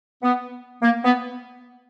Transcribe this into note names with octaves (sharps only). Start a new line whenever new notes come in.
B3
A#3
B3